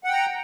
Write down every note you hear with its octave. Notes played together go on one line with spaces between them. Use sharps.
F#5 G5 A#5